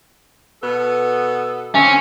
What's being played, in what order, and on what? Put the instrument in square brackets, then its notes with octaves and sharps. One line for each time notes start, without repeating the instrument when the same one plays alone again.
[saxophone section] B2 B3 A4
[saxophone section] D3 C4 [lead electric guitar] C#4